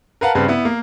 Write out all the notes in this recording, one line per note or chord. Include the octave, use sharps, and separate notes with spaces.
A#4 B4 F5 F#5 A5
G2 C#3 C4 B4
B3 E4
A#3